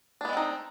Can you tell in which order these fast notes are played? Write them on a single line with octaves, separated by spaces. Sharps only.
D4 B3 G#3 C4 D#4